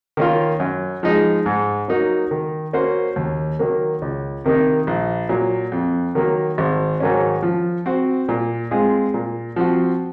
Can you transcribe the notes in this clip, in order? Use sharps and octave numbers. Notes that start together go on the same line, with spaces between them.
D#3 A#3 C#4 F4
F#2
F3 G#3 D#4 G#4
G#2
F#3 A#3 D#4 F#4
D#3
A#3 C#4 F#4 C5
D#2
D#3 F#3 A#3
C#2
C3 D#3 A#3 D#4
A#1
A#2 F#3
F2
D#3 F#3 A#3
G#1
G#2 D#3 F#3 C#4
F3
C4 F#4 C5
A#2
G#3 C4 F4 G#4
A#2
F3 C4 F#4